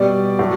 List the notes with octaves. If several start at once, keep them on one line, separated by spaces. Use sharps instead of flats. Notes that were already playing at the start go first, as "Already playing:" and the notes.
Already playing: B2 G3 D5
A2 F#3